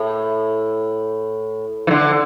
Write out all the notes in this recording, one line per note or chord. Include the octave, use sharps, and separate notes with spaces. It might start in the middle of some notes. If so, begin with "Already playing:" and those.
Already playing: A2
E3
D3